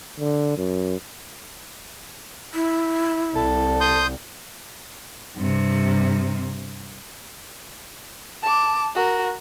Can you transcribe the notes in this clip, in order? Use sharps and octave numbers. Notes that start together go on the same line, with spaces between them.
D3
F#2
E4
C2 A4
C6 D#6 G6
G2 C3
A5 D6
F#4 A#4